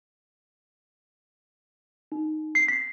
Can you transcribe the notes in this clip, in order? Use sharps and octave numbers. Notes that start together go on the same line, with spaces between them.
D#4
C7
B6